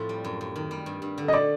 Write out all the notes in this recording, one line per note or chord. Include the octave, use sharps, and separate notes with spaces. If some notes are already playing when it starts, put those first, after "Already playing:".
Already playing: A2 F3 A3 C4
G3
F#2
F#2
D#3
G3
G2
G2
D3
D#5
A3 D5